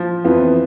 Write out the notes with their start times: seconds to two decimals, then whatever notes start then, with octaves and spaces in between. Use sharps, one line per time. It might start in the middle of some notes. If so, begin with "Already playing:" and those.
Already playing: F3
0.24 F2 E3 B3 F4